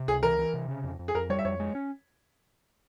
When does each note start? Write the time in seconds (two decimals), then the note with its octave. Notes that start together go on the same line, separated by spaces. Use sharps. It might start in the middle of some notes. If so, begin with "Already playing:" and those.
Already playing: C3
0.08 C#2 G#4
0.23 E3 A#4
0.39 E3
0.54 C3
0.68 C#3
0.84 F2
0.99 F2
1.08 G#4
1.15 F2 A#4
1.30 G3 C#5
1.39 E5
1.45 F2 C#5
1.60 G#3
1.75 C#4